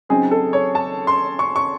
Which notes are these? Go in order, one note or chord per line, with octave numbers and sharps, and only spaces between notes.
C#2 C#3 F#3 C4 D#4 G#4
A4
C#5
A5
C6
C#6
C#6